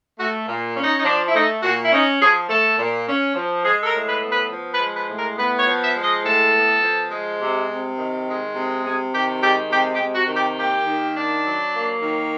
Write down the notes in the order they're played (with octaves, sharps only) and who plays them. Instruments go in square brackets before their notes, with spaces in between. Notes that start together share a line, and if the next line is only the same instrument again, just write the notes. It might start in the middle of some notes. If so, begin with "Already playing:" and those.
[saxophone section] A3 F#4
A#2
C#4
D#4
D#4
F3 D4
E4
A3 D#4
A#2 F#4
E4
C#4 D#4
F3 G#4
A3 A4
A#2
C#4
F3
G#3 G#4
A4
A#4
A2
B4
B3
B4
F3
B4
G#3
B4
A2
A#4
B3 B4
C#5
F3
E5
G#3
D#5
A2 A4
B3
F3
G#3
C3
C3
D#3
G#3
C3
C3 G#4
D#3 G4
G#3 G4
C3 G4
G4
C3
F#4
D#3
G4
A#3 G4
D#3
D4
F#3
A#3
D#3